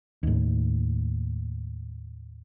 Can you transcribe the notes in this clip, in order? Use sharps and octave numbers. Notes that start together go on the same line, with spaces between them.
D#2 A2